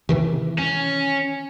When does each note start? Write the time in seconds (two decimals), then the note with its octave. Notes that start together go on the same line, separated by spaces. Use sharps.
0.09 C3 D#3 E3
0.58 C#4